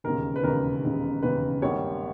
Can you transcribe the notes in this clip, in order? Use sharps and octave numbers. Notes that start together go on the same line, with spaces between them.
E1 D#2 C#3 A#4
B4
E1 D#2 C#3 A#4
E1 D#2 C#3
E1 D#2 C#3 B4
G#1 G2 G3 A#3 C#5